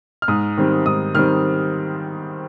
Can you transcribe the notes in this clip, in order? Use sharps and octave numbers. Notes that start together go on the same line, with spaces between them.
F6
G#2 D#6
D#3 G3 C4
G#2 D#6
D#3 G3 C4 F6